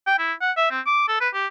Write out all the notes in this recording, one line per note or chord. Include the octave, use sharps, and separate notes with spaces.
G5
E4
F#5
E5
C4
D6
A4
B4
G4